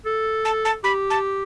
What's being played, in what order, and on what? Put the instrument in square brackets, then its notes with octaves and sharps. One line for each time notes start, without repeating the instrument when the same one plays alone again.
[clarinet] A4
[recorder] A5
A5
[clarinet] G4 [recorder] B5
[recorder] A5